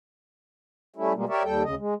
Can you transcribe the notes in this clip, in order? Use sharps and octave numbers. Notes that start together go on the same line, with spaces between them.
G3 A3 C#4 E4
B2 G3 G#3 A#3
G4 A#4 C#5 D5 E5
D#2 G3 A4 G5
D2 C#3 D#5
G#3